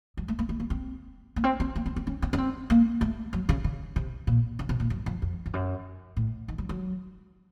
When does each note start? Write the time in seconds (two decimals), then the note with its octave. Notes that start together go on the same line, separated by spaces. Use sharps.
0.17 F#3
0.28 A3
0.39 A#3
0.49 A3
0.60 A#3
0.70 C4
1.36 A#3
1.44 C4
1.60 C4
1.76 A#3
1.86 C4
1.96 C4
2.07 C#4
2.22 C4
2.33 C#4
2.38 C4
2.70 A#3
3.01 A3
3.33 F#3
3.49 C#3
3.64 C#3
3.96 C3
4.27 A#2
4.59 C#3
4.69 C3
4.80 A#2
4.90 F#2
5.06 F2
5.22 F2
5.46 F2
5.54 F#2
6.17 A2
6.48 D#3
6.58 F#3
6.69 F#3